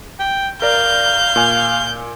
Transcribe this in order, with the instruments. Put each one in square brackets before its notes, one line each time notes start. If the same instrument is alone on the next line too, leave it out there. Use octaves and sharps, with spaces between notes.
[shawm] G5
[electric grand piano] A#4 D5 [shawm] F5 [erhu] G6
[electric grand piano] A#2 G#5